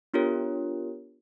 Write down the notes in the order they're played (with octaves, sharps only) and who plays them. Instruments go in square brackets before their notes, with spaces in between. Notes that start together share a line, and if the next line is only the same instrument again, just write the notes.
[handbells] B3 D4 F4 G4 A#4 C#5